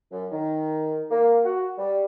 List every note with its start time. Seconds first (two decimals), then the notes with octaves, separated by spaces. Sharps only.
0.11 F#2
0.32 D#3
1.10 A#3
1.45 F#4
1.78 G3